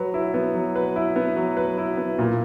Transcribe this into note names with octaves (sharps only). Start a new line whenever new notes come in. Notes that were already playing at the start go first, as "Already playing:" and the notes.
Already playing: F#3 B4
E4
B3
F#3
B4
E4
B3
F#3
B4
E4
B3
A#2